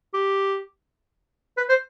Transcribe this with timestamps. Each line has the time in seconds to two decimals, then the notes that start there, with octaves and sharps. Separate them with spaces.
0.14 G4
1.57 B4
1.69 C5